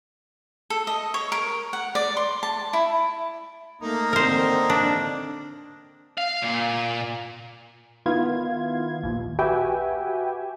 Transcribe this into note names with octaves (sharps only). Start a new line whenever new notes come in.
A4
D#5
C#5
A#4
F#5
D5
C6
A5
E4
A3 A#3 D#4
D3 C4 A#4 C5
D4
F5
A#2
D#3 B3 E4 F4 F5 G#6
A#1 D#2
F#4 G4 B4 E5 G5 G#5